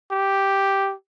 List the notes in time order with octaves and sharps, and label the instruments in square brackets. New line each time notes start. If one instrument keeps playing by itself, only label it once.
[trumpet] G4